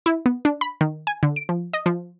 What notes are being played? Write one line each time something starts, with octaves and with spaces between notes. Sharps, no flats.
E4
B3
D4
B5
D#3
G#5
D3
D7
F3
D#5
F3